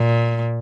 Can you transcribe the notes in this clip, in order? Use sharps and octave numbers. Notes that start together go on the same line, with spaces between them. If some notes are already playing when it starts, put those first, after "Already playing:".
Already playing: A#2